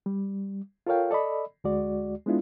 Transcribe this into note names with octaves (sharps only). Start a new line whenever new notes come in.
G3
F4 A4 A#4 C#5 F5 G5
A4 D5 D#5 B5
D2 G#3 F#4 D5
G#3 B3 D4 E4 F4